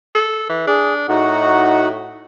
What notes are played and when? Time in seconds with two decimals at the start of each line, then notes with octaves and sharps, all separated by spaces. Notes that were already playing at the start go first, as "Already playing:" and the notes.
0.15 A4
0.49 E3
0.67 D4 G#4
1.09 A2 D#4 F#4 F#5